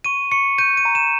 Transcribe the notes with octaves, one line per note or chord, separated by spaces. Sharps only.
C#6 D#7
C#6 C#7
G6 D#7
D#7
A#5
E7